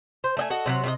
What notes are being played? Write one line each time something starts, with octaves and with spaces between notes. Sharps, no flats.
C5
A3 D#5 G#5
F#4 A4 D#5
C3 F3 F#3
C3 F#4 D#5